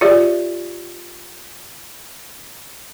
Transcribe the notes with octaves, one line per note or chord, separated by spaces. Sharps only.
F4 G4 G#4 C#5 D5 E5